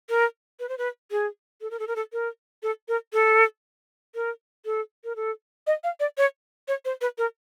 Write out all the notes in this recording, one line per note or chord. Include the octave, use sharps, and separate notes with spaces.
A#4
B4
C5
B4
G#4
A4
A#4
A4
A#4
A4
A#4
A4
A#4
A4
A#4
A4
A#4
A4
D#5
F5
D5
C#5
C#5
C5
B4
A#4